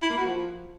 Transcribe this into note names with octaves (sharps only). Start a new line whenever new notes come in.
E4
A#3
F#4
F3